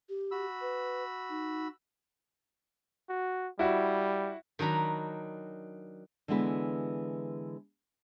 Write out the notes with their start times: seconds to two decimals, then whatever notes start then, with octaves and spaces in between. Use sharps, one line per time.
0.09 G4
0.31 F#4 B5 E6
0.61 B4
1.30 D#4
3.09 F#4
3.59 G3 E4 F#4
4.59 D#3 F#3 D4 A#5 B5
6.28 D3 E3 G#3 B3 E4 B4